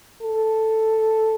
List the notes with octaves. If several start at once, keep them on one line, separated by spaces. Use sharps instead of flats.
A4